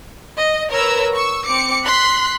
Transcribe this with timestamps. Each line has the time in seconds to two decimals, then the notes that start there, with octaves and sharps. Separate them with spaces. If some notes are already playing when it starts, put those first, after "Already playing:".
0.40 D#5
0.72 A#4 B4 C#5 A#5 E6
1.15 C#6 E6
1.45 C4 D6 C#7
1.83 C6 F#6 B6